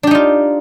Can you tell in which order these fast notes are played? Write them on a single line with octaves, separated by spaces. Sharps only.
D4 G4 D#4 F4